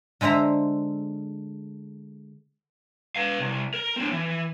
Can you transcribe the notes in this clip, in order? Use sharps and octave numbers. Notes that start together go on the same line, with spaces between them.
D3 G#3 C5 E5 A#5
B4 F5
C2
A#4
C4 D4
E3